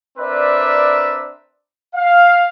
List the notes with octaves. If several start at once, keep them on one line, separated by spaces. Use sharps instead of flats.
C4 D4 A#4 B4 D5 E5
F5